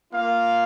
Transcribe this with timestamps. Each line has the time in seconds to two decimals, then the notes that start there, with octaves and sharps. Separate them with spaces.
0.10 A#3 F4 F5